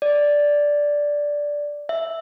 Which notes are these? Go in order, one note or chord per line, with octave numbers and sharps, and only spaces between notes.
D5
E5